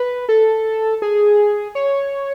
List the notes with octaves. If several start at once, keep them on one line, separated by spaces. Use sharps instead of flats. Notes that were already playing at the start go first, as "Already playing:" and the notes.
Already playing: B4
A4
G#4
C#5